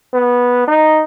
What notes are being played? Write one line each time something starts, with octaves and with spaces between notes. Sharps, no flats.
B3
D#4